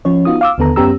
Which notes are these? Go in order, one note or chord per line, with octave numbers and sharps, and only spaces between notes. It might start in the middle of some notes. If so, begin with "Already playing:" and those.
F3 C#4 C#5
B3 D#4 F4 F#4 D#6
F5 D6 E6
D#2 D3 B3 A4 A#5
F#2 B3 C#4 G4 A#5 E6